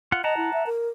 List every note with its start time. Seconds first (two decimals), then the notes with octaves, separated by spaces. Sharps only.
0.12 F4 F#5
0.24 D#5 F#5 A5 A#5
0.37 E4
0.53 E5
0.66 A#4